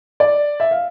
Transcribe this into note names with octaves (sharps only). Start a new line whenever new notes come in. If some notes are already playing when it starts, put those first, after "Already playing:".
D5
E5
F5